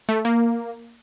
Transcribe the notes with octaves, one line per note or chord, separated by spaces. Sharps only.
A3
A#3